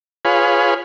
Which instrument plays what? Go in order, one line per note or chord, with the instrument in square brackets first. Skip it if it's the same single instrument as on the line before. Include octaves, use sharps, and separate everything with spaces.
[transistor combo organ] F4 G#4 B4 C#5